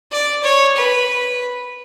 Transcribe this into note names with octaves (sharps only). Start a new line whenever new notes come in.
D5
C#5
B4